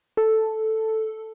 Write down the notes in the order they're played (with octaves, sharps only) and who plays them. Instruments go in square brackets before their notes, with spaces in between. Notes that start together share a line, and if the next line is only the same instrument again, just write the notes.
[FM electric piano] A4